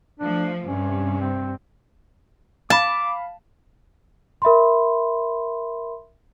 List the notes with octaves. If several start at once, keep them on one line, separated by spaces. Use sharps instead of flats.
F3 A3 D4
G2 C3 C#4
C4
F5 A5 B5 D6
A#4 E5 B5 C6